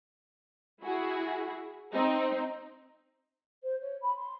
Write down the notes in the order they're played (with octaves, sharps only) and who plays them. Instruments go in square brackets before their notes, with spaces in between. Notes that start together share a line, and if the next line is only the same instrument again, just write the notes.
[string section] E4 F#4 G#4
C4 D#4
[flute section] C5
C#5
B5
C6